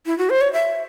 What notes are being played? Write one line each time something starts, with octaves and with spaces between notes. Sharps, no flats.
E4
F#4
C5
C#5
E5